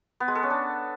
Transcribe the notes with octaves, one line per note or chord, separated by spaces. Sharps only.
B3
G#3
A4
C#4
D4